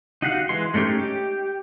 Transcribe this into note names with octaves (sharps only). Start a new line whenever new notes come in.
D#4 F#4 G4 F5 F#5
E3 G#3 C6
G#3 A3 C#4 D#4 G4
G4